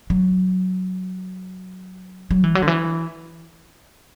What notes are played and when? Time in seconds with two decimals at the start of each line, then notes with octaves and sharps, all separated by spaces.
0.10 F#3
2.31 F#3
2.44 E3
2.55 F#3
2.62 D3
2.68 E3